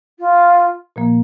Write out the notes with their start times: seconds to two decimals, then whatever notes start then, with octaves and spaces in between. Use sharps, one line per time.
0.19 F4
0.96 A#2 F3 A#3